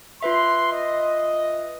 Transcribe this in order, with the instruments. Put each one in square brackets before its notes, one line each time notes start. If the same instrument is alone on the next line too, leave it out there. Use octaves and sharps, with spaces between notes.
[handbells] F4 B4 E5 [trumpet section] C6
[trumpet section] D#5